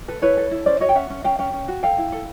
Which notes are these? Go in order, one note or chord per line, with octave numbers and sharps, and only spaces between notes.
A4 B4
E4 B4 C#5
A4
E4
C#4 C5 D5
F#4 C#5 D#5
G5
C#4 E5 F#5
C#4
C#4 F5 G5
C#4 F5 G5
C#4
F#4
A4 F5 G5
E4
A4